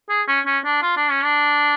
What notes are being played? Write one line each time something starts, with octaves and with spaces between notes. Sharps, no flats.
G#4
C#4
C#4
D4
F4
D4
C#4
D4